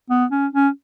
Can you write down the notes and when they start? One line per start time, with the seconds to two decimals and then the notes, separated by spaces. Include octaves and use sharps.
0.10 B3
0.32 C#4
0.53 C#4